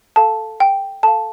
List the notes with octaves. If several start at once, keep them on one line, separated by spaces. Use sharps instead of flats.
A4 F5 A5
G5
A4 F5 A5